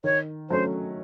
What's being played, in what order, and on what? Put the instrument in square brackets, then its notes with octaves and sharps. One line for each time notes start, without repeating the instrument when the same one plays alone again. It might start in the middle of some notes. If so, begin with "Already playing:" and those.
[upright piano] D#3 [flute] C#5
[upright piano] F#3 A3 C#4 [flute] C5